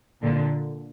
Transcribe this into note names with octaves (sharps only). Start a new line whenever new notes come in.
A#2 D3